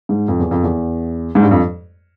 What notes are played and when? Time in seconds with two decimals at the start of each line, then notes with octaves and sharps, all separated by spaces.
0.09 G#2
0.28 F2
0.40 E2
0.51 F2
0.64 E2
1.35 G#2
1.43 G2
1.51 F2